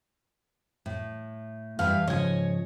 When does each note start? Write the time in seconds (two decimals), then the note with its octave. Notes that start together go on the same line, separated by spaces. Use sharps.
0.86 A2
1.79 G2 E3 B4 F5
2.08 G#2 C#3 F3 C#5 D#5 G#5